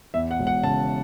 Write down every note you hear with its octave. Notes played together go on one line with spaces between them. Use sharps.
E2 E5
F#5
E1
F#5
C#3 A5